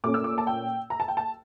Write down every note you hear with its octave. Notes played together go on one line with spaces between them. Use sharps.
A#2 A3 C#4 D6
E6
D6
A5
G5
A#5
A5
G5
A5